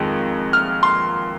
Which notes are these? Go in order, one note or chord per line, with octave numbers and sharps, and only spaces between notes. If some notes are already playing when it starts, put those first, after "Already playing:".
Already playing: F2 D#3 G#3
F6
C6